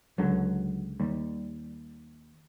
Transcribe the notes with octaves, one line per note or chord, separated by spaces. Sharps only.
C#2 D3 F#3
D#2 G3